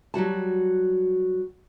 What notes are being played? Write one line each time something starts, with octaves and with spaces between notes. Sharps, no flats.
F#3 G3 F#4 A5